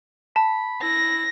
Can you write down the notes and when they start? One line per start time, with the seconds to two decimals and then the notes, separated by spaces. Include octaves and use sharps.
0.36 A5 B5
0.82 E4 A#6